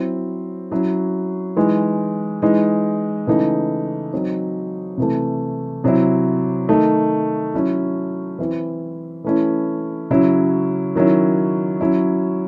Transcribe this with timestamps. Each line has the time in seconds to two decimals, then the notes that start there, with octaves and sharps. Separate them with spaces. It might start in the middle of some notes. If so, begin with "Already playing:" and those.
Already playing: F#3 C4 E4
0.71 F#3 C#4 E4
1.56 E3 G#3 D#4
2.42 E3 G#3 D#4
3.27 C#3 E3 A3 D#4
4.13 F#3 C4 D#4
4.97 C3 E3 A3
5.84 C3 F#3 C4 E4
6.69 D#3 A3 D#4
7.54 F#3 C#4 E4
8.39 E3 C4 E4
9.24 E3 A3 C#4 E4
10.10 C#3 F#3 C#4 E4
10.95 D#3 F#3 C#4 E4
11.81 F#3 C#4 E4